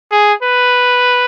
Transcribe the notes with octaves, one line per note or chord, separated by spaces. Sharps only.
G#4
B4